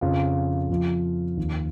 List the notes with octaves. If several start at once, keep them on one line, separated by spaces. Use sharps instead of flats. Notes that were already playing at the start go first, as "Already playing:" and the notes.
F2 C#3 F3 F4
F2 F3 F4
D#2 D#3